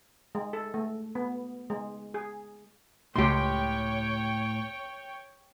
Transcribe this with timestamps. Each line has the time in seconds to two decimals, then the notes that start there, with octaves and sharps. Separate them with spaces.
0.35 G#3
0.53 A4
0.74 A3
1.15 B3
1.70 G#3
2.14 G#4
3.16 C#2 A2 G4 C#5 G5 C6